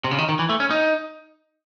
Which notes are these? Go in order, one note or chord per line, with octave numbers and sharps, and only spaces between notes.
C3
C#3
D#3
D#3
E3
A3
C#4
D#4